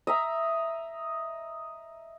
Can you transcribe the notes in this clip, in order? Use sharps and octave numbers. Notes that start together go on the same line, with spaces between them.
D#5 E5 A#5